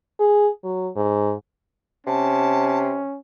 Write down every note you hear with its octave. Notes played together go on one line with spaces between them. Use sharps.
G#4
F#3
G#2
C3 C#4 A5